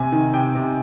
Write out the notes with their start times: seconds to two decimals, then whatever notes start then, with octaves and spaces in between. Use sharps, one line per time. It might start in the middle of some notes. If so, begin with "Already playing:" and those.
Already playing: C3 G#5
0.12 D#3
0.33 C3 G5
0.55 C3